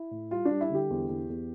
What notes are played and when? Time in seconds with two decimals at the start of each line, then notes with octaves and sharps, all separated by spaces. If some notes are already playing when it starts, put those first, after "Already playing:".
Already playing: E4
0.11 A2
0.31 G3 F4
0.45 G3 D4
0.61 E4
0.70 D3 G4
0.90 E2
1.09 E2
1.30 E2